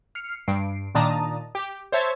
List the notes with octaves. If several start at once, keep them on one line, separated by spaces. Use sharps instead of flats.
F6 C7 C#7
G2 C7 D7
A#2 D#3 D4 A5 A#5 D#6
G4
C5 C#5 E5 A5 G#6